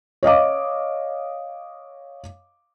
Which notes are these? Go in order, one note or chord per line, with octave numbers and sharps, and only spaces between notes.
C#5 D#5 F5 D6